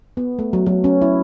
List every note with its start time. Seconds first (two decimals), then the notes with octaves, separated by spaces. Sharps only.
0.17 B3
0.39 A3
0.53 F#3
0.66 F#3
0.84 C#4
1.02 E4